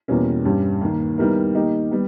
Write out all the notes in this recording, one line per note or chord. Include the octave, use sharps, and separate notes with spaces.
E2 B2 G3 A#3 C#4
G2 G3 C#4 G4
D#2 D#3 A#3
D#3 G3 B3 E4 A#4
D#3 A#3 D#4 G4
G3 B3